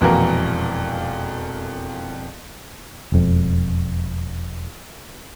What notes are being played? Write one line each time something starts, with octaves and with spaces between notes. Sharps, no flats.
E1 F2 A#2 E3 F#4 A#4
E1 F2